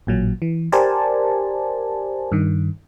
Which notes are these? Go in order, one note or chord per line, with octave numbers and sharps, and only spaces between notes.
A1 A#2 F#3
E3
G4 A#4 C5 D5 G#5 A5
G2 D#3